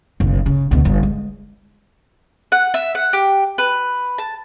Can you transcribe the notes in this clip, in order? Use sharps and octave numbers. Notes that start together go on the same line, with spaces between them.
F#1 B1
C#3
D2 B2
G1
G#3
F#5
E5
F#5
G4
B4
A5